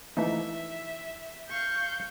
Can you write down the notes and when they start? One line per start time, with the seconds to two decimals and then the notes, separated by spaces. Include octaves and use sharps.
0.17 E3 F3 A3 D#4 E5
1.49 F5 C#6 G6